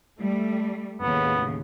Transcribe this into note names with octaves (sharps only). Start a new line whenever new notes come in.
G3 A3
D#2 A2 C#3 B3